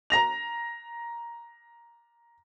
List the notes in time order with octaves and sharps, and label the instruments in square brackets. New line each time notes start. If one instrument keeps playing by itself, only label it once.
[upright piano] A#5 A#6 F7